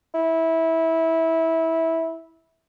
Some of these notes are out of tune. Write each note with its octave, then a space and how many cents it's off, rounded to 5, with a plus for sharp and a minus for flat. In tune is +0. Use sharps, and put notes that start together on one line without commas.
E4 -15